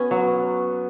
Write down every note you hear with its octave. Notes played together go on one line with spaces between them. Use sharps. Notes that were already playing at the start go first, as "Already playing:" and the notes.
Already playing: B3 C#4 F#4
F#3